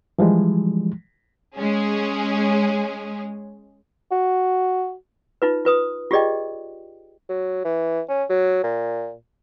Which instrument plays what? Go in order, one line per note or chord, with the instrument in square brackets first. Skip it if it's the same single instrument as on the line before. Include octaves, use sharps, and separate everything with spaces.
[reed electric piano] E3 F3 G3 G#3
[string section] G#3 C#4 G#4
[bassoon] F#4
[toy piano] D#4 F4 B4
F4 B4 D#6
F4 G4 G#4 D5 D#5 G5
[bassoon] F#3
E3
C#4
F#3
A#2